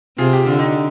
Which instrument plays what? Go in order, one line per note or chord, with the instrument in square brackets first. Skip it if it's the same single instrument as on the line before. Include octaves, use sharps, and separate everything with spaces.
[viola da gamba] C3 [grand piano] F4 G#4
[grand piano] G4
[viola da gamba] D3 [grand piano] F4
[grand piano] D#4 G4